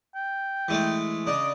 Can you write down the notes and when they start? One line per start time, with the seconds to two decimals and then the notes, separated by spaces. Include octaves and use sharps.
0.15 G5
0.68 E3 G#3 A3
1.27 C#3 D4 D#5